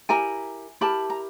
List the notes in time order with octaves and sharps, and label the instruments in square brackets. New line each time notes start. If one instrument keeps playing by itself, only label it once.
[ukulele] E4 G4 A#4 G#5 A#5
E4 G4 A#4 A5 B5
A#5